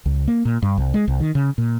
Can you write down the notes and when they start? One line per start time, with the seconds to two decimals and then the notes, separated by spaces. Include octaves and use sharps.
0.06 C#2
0.28 A#3
0.45 A#2
0.62 G2
0.78 C2
0.94 G#3
1.08 C2
1.20 D#3
1.35 C#3
1.58 A#2